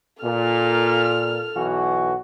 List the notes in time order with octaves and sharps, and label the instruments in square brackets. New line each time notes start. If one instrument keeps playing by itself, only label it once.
[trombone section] A#2 [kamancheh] A4 F6
[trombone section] B1 E3 F#4